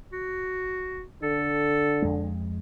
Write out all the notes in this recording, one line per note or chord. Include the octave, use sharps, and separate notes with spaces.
F#4
D3 A4
F2 G#3